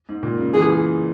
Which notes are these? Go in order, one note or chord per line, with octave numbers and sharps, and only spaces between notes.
G#2
A#2
C#3
E3 G#4